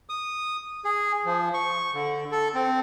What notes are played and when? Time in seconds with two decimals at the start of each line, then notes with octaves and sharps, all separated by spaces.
0.09 D#6
0.85 G#4
1.25 F3
1.54 C#6
1.94 D3
2.31 A4
2.55 C4